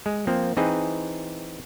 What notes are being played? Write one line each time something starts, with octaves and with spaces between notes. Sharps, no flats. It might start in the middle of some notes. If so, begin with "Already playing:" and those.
G#3
F3 A#3 C4
E3 C4 D#4 G#4 B4 D#5